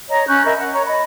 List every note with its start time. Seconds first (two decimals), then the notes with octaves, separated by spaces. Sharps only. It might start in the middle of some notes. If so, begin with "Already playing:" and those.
0.09 C#5 D#5 A#5
0.28 C#4 C#6 F#6 G6
0.45 A#4 D#5 E5 B5
0.60 F#5
0.73 C#5 A#5 C#6
0.86 D#5 B5